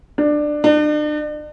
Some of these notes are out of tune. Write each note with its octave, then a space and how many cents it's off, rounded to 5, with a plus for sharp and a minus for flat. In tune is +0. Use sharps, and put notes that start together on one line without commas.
D4 +15
D4 +40